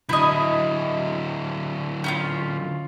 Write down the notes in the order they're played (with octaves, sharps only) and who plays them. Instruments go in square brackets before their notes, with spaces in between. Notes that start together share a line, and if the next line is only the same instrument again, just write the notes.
[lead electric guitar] D3 F#3 [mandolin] E4 D#5
[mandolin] C#4 E4 F4